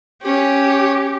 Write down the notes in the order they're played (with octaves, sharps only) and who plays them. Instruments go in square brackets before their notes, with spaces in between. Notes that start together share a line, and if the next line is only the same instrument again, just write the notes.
[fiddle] C#4 C#5 [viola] G4